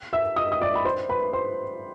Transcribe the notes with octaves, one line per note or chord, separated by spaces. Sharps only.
E5 E6
D#5 D#6
D#6
D5 D6
B5
C5 C6
B4 B5
C5 C6